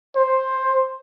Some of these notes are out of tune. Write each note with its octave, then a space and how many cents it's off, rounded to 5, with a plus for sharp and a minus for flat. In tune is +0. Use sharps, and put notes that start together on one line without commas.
C5 +10